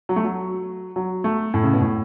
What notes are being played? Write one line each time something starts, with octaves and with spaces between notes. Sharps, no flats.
F#3
A3
F#3
F#3
A3
A2
C#3
B2
A2